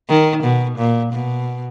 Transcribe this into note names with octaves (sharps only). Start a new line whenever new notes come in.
D#3
B2
A#2
B2